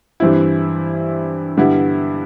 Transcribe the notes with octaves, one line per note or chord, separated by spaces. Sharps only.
G2 E3 G3 C4 E4
G2 D3 G3 B3 E4